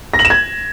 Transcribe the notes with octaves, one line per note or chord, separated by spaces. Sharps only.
A#6
F#7
E7
G#6